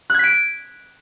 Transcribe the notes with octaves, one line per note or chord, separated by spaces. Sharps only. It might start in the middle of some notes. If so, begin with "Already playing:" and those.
F#6 G#6 B6 D7